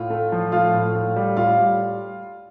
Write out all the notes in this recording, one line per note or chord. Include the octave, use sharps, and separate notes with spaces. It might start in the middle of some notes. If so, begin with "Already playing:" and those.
Already playing: A2 F4
A3
F3
A2 F4 F5
A2
A2
G3
A2 F4 F5
G3